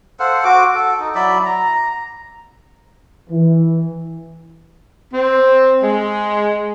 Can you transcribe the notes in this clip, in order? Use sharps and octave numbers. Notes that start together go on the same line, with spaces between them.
A4 C5 F5 F#5
F#4 D6
A4
D#4
F#3 E4 D5 B5
A#5
E3
C4
G#3